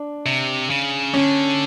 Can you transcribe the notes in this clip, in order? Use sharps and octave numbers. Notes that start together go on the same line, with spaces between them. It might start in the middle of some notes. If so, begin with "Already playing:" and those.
Already playing: D4
C3
C#3
D3 C#4